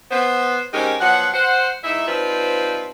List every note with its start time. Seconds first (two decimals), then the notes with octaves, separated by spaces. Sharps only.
0.11 B3 C5
0.73 G#3 C4 C#4 D#4 G4 A#4
1.01 F3 F#3 B3 F#5
1.34 C5 F#5
1.84 G#2 D#4 E4 E5
2.07 F3 G3 C4 D#4 F4 B4